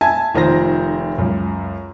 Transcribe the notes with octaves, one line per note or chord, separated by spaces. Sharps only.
E5 G#5 A5 G#6
F1 D#3 F3 C5 A#6
C#2 F#2